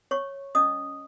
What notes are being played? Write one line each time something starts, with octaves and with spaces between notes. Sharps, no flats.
C#5 C#6
C#4 D#5 D#6